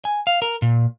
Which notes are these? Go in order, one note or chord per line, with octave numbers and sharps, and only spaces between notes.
G#5
F5
A#4
A#2